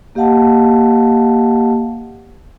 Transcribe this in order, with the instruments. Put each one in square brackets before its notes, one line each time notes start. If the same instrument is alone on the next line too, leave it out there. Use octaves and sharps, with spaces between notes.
[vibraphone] A#3 G4 D#5 F5 F#5 A5